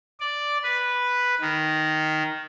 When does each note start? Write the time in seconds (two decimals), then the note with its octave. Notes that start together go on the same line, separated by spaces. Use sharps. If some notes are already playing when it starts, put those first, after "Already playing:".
0.20 D5
0.64 B4
1.41 D#3